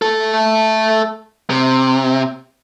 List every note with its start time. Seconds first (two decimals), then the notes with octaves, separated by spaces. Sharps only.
0.02 A3 A4
1.50 C3